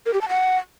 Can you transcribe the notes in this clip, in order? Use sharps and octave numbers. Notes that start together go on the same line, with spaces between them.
A#4
G4
A5
F#5